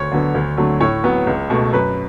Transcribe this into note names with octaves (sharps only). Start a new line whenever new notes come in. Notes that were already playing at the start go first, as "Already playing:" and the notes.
Already playing: D2 C#5
D3 F#3 B3
D2
D3 F#3 A3
A2 C#5
F#3 B3
C#2
B2 A3
F#2 B4